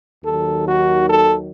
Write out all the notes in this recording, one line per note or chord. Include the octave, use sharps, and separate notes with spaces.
D#2 D#3 F#3 A4
F#4
A4